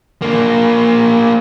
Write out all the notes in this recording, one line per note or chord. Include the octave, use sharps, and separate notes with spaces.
A#3 D4